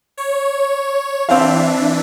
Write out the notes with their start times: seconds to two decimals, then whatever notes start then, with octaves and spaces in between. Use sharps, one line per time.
0.17 C#5
1.29 E3 C4 D4 E5 F5